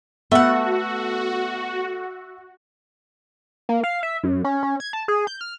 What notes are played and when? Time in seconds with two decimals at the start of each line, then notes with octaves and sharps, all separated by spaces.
0.32 A3 B3 F#4 E5 F#5
3.69 A#3
3.84 F5
4.03 E5
4.23 F#2
4.44 C#4
4.63 C#4
4.80 G#6
4.93 A5
5.08 G#4
5.27 G6
5.41 F6